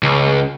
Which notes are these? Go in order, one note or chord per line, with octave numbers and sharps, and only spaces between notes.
C#2